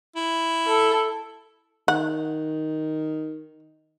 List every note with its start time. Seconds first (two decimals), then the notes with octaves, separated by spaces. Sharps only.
0.16 E4
0.67 A4
1.88 D#3 F#5